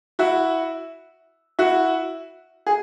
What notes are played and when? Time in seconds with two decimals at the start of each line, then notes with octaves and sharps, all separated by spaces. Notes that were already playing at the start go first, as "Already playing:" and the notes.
0.19 E4 F#4
1.59 E4 F#4
2.67 G#4